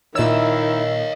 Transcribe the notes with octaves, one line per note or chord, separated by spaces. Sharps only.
A#2 D#3 D#4 E4 C#5 D#5 E5 E6